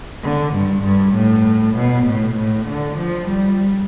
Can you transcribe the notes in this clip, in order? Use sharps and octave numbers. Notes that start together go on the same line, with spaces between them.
D3
G2
G2
A2
B2
A2
A2
D3
F3
G3